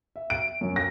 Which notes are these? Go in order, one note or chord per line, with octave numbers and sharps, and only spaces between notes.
E5
D7
F#2 F#3
A#6